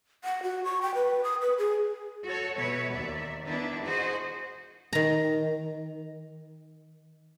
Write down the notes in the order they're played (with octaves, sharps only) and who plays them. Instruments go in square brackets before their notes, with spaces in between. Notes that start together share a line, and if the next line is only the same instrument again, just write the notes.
[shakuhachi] F#5
F#4
C#6
G5
B4
D#6
B4
G#4
[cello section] F#4 A4 C#5
B2 B4 C#5 E5
D#2 D5 E5
D#3 B3 D4 E4
F#4 G#4 C5 D#5
[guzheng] D#3 A#5